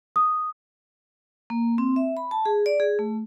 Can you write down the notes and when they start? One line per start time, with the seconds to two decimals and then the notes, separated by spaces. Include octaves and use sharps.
0.16 D#6
1.50 A#3
1.78 C4
1.96 E5
2.17 B5
2.31 A5
2.46 G#4
2.66 D5
2.80 G#4
2.99 A3